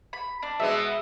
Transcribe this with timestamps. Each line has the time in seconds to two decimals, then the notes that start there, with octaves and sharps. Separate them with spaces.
0.13 B5
0.43 D4
0.60 B2 G#3 B3 E5